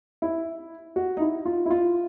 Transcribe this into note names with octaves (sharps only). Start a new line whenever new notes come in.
E4
F#4
D#4
E4
F4
E4
F4